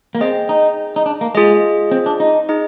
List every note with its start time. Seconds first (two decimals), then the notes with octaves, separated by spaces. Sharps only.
0.15 A#3
0.21 C4 G#4 D#5 G5
0.49 D#4
0.96 D#4
1.06 D4
1.21 A#3
1.35 G#3 F4 G#4 D#5
1.91 C4
2.06 D4
2.20 D#4
2.49 D#4 G#4 D#5